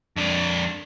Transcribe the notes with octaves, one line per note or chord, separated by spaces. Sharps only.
F2 D4